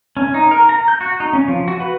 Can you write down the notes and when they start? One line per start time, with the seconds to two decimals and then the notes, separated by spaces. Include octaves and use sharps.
0.17 C#4
0.34 D#4
0.51 A#4
0.69 A#5
0.88 G6
1.01 F#4
1.20 D#4
1.33 C#4
1.48 F3
1.68 F#4
1.80 B4